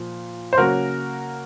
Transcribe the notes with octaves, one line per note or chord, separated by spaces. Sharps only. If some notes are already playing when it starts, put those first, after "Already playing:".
Already playing: A#2 F3
C5
C#3 F#3 A#3 C#4 F#4 A#4